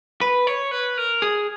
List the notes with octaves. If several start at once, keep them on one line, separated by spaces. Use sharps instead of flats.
B4
C#5
B4
A#4
G#4